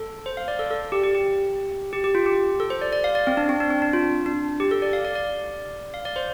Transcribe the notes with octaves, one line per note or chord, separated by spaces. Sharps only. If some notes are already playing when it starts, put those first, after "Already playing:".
Already playing: A4
C5
F5
D5
A4
A4
G4
G4
G4
G4
G4
F4
G4
A4
C5
D5
D5
F5
D5
C4
D4
C4
D4
C4
D4
F4
D4
G4
A4
D5
F5
D5
D5
F5
D5
C5